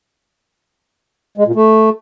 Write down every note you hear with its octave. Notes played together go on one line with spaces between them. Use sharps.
G#3
A#2
A3